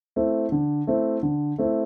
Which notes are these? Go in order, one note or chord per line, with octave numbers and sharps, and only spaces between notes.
A3 C4 E4
D3
A3 C4 E4
D3
A3 C4 E4